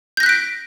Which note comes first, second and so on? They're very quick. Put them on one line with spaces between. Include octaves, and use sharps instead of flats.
G6 A#6 F#6 B6 D7